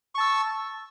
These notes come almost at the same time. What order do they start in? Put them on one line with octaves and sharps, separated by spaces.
C#6 A5 E6